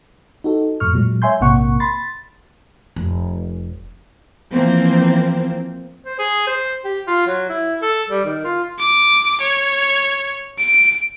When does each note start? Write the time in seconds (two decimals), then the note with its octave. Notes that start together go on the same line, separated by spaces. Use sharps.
0.44 D#4 F#4 A4
0.80 F2 A2 C#6 F6
0.94 A#2 F#3 G#3
1.22 C#5 E5 G#5 C6 G6
1.40 A#1 G#2 C3 A#3 F#5 C#6
1.80 B5 C6 A6
2.96 F1
4.52 E3 F3 A#3 C4
6.05 C5
6.19 G#4
6.47 C5
6.85 G4
7.07 F4
7.27 F#3
7.49 E4
7.82 A4
8.10 G3
8.25 D#3
8.45 F4
8.79 D6
9.41 C#5
10.59 D7